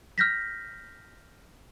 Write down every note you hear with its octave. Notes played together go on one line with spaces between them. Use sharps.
F6 G6 A#6 B6